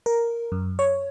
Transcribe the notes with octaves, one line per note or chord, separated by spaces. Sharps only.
A#4
F#2
C#5